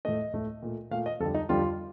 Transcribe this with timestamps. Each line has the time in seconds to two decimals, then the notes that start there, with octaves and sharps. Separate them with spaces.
0.05 A2 A3 D#5
0.34 A2 A3
0.62 A#2 A3
0.91 A#2 A3 F5
1.06 D#5
1.20 F2 D3 G3 A4
1.35 D#4
1.49 F2 D3 G3 F4